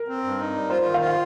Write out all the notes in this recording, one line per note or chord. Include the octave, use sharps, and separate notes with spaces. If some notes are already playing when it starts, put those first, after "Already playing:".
Already playing: A#4
C4
G2
D#4
G3
F4 C5
D#3
F5
F4
F5